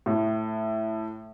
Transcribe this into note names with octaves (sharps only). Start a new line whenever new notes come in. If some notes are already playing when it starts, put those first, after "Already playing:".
A2